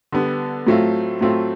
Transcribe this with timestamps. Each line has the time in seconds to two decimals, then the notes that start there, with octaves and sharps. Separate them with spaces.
0.12 D3 G3 B3
0.67 A2 F#3 A3 C4 F4
1.21 A2 F#3 A3 C4 F4